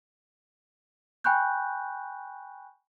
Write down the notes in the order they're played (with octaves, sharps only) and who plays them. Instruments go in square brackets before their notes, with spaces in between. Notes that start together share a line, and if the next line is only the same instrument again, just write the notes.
[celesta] G5 G#5 B5 C#6 F#6 G6